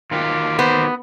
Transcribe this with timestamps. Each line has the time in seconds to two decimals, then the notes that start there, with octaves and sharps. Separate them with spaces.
0.11 D#3 F#3 F4 G4
0.59 B3 C5